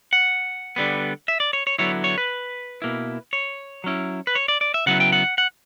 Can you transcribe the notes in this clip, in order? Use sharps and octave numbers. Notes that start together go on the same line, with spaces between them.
F#5
D3 G3 B3
E5
D5
C#5
C#5
D3 F#3 B3 E4 C#5
C#5
B4
B2 A#3 E4
C#5
F#3 C#4 E4
B4
C#5
D5
D5
E5
C#3 F#3 B3 E4 F#5
G5
F#5
F#5